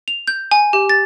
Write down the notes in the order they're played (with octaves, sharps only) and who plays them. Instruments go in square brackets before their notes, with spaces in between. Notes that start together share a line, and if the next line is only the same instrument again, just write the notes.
[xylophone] F7
G6
G#5
G4
A6